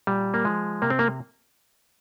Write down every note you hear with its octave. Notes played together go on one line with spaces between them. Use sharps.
A#2 G3
A#3
F3 G#3
C3 A#3
C4
A#3